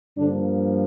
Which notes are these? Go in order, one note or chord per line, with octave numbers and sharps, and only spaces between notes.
G2 D3 F3 A#3 D4